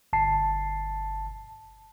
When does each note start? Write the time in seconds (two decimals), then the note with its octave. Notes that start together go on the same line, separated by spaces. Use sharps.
0.13 G1 A5 C7